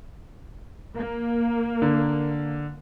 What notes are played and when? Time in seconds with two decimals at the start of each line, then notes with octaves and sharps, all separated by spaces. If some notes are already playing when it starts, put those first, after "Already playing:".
0.96 A#3
1.82 D3